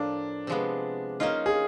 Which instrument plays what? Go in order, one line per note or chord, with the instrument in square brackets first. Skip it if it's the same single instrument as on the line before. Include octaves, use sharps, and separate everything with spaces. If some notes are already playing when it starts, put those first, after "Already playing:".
Already playing: [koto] A2 F3 A#3 [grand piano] D4
[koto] C3 F3 G#3 B3
[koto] A#3 C#4 F4 [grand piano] D#4
[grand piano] G#4